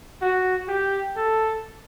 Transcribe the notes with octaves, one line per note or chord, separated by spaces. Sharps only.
F#4
G4
A4